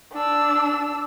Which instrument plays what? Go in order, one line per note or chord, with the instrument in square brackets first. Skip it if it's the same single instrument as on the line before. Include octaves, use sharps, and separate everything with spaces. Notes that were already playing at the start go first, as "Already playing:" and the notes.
[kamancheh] D4 E6